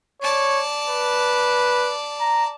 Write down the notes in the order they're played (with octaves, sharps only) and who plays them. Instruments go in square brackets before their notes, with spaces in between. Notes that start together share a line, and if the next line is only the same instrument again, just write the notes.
[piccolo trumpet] C#5 [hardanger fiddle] D5 A5
[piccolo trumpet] B4
A#5